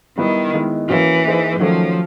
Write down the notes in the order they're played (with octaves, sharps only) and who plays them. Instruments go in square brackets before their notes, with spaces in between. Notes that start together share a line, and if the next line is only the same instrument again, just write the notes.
[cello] D#3 [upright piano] G3 B3 E4
[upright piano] D#3 G#3 B3 E4
[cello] E3 [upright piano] A#3 C#4 F#4
[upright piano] A#3 D#4 G#4 C5
[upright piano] D#3 F#3 A3 C#4 [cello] F3